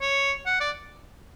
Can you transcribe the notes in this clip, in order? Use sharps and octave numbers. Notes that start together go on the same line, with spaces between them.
C#5
F#5
D5